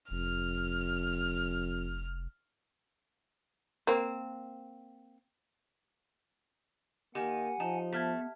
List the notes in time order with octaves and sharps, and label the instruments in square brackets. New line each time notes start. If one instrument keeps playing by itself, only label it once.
[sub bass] F1 [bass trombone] F2 [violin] F6
[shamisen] A#3 C4
[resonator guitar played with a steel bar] D#3 [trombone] A#3 [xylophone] G4 [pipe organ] F#5 G#5
[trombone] F3 [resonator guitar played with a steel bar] D#4 [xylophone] A5
[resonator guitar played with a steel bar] A3 [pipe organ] B3 [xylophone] E5 F6 G#6